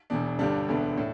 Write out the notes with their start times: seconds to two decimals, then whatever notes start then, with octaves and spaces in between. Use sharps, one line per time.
0.10 E1 E2 B2 D4
0.39 G1 G2 D3 G3 D4
0.68 E1 D2 D3 B3
0.97 A2